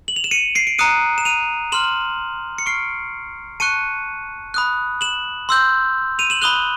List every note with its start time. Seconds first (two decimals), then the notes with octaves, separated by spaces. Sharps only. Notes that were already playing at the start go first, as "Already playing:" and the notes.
0.08 F#7
0.16 F7
0.24 E7
0.31 C#7 D#7
0.55 C7 D7
0.67 D7
0.78 A#5 D#6 F#6 C#7 D#7
1.18 E7
1.25 D#7 F7
1.72 C6 F6 E7 F#7
2.58 C#7
2.66 C#6 F6 C7 D7
3.60 A5 C#6 F#6 C#7 D#7
4.54 B5 D#6 F#6
5.01 E7 F#7
5.49 C6 E6 G6
6.19 D#7 F7
6.30 E7 F#7
6.42 B5 D#6 F#6 F7 G7